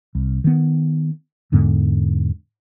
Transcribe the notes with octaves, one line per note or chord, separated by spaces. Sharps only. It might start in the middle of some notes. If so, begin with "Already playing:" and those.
C2
D#3 B3
E2 G#2 D3 B3